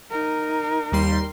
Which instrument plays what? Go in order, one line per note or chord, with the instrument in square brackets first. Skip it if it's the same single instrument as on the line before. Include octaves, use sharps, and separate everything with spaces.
[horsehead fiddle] D#4 A#4
[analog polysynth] D#2 G3 C6